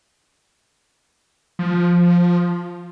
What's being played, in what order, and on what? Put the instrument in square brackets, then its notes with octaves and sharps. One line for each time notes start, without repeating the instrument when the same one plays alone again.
[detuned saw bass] F3